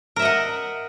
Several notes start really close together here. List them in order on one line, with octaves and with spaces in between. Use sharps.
A#4 E5 D#5 F#5